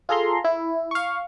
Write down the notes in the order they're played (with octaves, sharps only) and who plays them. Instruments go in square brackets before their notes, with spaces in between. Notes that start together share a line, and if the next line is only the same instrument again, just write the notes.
[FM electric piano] F4 G#4 A4 A#5 C6
E4
F5 C#6